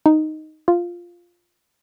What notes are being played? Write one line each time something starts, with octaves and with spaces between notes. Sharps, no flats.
D#4
F4